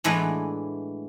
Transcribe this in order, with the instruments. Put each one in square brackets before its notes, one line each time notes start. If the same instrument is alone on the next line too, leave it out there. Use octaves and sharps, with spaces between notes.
[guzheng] A2 E3 G#3 B3 D4